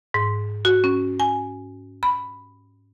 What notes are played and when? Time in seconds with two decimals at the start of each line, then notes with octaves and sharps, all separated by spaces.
0.14 G#2
0.65 F#4
0.84 C#4
1.20 G#5
2.03 B5